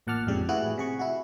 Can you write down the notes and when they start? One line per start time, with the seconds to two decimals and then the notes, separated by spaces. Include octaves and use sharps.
0.07 A1 A#2 F#5 A5 D6 F6
0.27 A1 F2 G#2 C#3 G3 G4
0.49 A2 E3 E4 F#4 G#4 F#6
0.78 C3 G#4 C#6
0.99 E4 F#4